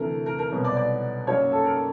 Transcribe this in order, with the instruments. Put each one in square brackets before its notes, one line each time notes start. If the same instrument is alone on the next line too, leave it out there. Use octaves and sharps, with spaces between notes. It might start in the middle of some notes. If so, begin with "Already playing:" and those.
Already playing: [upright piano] D2 C3 E3 A3 A#4
A#4
A#4
C2 B2 F#3 B3
D5
D5
F#2 C#3 F#3 A#3 C#5
A4
A#4